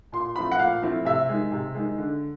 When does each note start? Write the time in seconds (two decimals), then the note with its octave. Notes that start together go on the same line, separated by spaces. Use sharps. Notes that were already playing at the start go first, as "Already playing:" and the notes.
0.12 A#2 C6
0.36 F3 A3 C4 E4 B5
0.52 F#5
0.59 A#2 F5
0.82 F3 A3 C4 E4
1.05 C3 E5
1.29 D#3 G#3
1.52 C3
1.75 D#3 G#3
1.98 D3